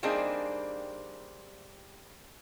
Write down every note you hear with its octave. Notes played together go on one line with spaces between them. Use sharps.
G3 A#3 C4 D4 D#4 G#4